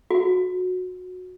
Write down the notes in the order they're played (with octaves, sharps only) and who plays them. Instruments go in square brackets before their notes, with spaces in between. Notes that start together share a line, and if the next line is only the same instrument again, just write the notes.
[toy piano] F#4